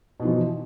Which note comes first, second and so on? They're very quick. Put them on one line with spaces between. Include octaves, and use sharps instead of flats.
B2 D#4 F3 E3